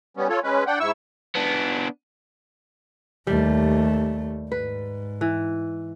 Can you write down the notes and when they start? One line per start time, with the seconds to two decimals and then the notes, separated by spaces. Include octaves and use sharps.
0.17 G3 B3 C#4
0.29 F4 A4 C#5
0.43 G#3 C#4 B4
0.67 D4 F#5 G5
0.80 G#2 E4 C#6 E6
1.36 B3 D4
3.27 D#2 G3 A3
4.52 G#2 B4
5.21 E3